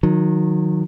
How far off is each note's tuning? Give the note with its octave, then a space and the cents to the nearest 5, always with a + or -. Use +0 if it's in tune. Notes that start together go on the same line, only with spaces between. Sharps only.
D#3 -10 F#3 -30